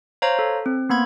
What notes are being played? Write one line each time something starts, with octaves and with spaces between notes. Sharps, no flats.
C5 C#5 F5 A#5
A4
C4
A#3 B3 B5 G#6